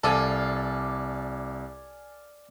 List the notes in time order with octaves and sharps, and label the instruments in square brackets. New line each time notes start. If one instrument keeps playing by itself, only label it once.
[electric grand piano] C2 D#7 [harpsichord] A4 [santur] D5 F5 G#5